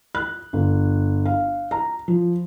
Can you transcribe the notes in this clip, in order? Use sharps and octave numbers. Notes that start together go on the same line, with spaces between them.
F#6
G1
F5
A#5
F3